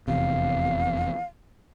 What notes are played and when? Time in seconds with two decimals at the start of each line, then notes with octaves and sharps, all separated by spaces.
0.08 F1 E2 C3 F5